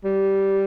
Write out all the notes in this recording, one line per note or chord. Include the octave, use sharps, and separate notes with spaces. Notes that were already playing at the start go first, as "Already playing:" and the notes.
G3